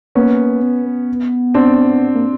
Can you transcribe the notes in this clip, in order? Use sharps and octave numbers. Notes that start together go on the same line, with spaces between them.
A#3 B3 C#4
B3
B3
C4 D4
A#3